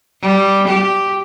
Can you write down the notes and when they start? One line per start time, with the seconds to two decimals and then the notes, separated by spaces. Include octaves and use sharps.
0.22 G3
0.68 G4